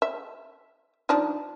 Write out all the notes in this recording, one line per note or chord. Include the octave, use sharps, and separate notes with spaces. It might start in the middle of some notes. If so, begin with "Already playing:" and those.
E5
F3 D4 D#4